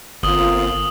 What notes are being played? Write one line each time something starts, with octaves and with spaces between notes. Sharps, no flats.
G1 A#3 C4 F4 D#6 F#7 G7